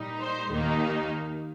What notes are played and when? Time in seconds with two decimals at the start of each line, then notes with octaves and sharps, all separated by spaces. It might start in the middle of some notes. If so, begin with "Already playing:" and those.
Already playing: A#2 G3 D#4
0.20 C5
0.50 D#2 D#3 A#3 D#4